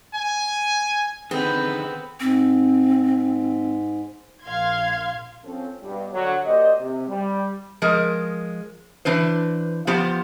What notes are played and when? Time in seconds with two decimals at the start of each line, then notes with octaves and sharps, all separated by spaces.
0.15 G#5
1.31 D3 D#3 B3 C4 G#4 A4 B4 G5
2.20 G#2 C4
4.44 A#1 F5 C6 G#6
5.45 F3 C4 C#4 A4
5.82 G2 B2 G3
6.12 D3 F#3 C#5
6.45 A#3 G4 C5 D5 D#5
6.79 C3
7.08 G3
7.82 F3 G#3 A#4
9.05 E3 D4 B4 C5
9.87 F3 B3 F4 G4 C5